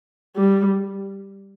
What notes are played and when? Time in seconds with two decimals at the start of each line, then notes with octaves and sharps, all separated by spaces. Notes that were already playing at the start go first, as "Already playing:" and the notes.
0.36 G3